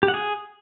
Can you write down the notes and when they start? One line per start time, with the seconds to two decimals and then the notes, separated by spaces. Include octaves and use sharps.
0.03 G4
0.08 F#5
0.14 G#4